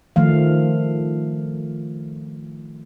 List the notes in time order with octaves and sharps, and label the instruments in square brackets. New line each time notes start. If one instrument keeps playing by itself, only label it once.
[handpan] D#3 F3 A3 F5